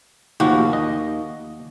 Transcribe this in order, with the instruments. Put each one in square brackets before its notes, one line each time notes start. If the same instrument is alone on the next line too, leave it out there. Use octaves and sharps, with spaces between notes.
[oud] D#2 [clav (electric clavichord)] F3 F#4 G4
[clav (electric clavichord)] D#5